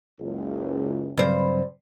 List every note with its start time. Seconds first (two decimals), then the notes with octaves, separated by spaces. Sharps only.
0.20 F#1 C#2
1.17 G2 C#3 F#3 C4 C5